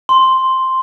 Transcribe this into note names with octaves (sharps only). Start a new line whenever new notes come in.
C6